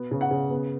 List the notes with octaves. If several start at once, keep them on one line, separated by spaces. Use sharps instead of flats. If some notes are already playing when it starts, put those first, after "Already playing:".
Already playing: B2 B3
C#3
F#5
C#3
B3